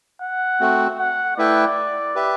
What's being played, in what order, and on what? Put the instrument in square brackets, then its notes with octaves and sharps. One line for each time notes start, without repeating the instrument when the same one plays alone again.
[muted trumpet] F#5
[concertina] A3 C4 F#4
[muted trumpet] F#5
[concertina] A3 E4 B4 E5 G5 [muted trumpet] D5
[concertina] G4 B4 E5